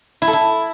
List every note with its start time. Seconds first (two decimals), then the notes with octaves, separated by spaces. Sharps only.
0.22 E4
0.27 A4
0.33 E4